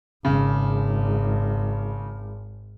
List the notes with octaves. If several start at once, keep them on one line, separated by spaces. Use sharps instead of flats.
G#1 C#3